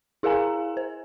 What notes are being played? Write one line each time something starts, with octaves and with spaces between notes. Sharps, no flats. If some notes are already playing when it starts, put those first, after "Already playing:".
E4 G#4 A#4 F5 G#5 A#5
C5